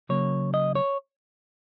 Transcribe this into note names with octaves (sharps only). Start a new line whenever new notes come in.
C#3 F#3 A#3 C#5
D#5
C#5